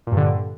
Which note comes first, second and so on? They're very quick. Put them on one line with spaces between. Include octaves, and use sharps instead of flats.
A#2 G2 D3